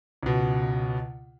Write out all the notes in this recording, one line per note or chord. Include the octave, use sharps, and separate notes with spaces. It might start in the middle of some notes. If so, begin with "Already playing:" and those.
C#2 B2